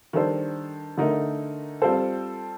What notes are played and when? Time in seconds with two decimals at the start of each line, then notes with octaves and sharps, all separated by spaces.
0.13 D#3 G3 D4 A4 C5
0.98 D3 A3 D#4 A#4
1.82 G3 C4 F4 A4 C5